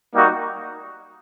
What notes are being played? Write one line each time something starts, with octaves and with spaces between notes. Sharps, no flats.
G3 A#3 D#4 F#4